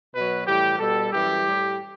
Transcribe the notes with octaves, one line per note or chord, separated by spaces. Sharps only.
B2 F#3 B4
A2 E3 G3 G4
B2 G3 A4
F#2 E3 G3 G4
A2 G3